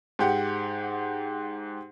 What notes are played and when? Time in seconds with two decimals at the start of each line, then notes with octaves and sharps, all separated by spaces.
0.19 G#2 G4 F#5